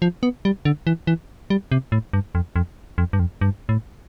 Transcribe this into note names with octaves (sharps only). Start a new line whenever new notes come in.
F3
B3
G3
D3
E3
E3
G3
C3
A2
G2
F2
F2
F2
G2
F2
G2
A2